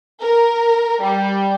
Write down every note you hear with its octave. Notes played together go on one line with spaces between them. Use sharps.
A#4
G3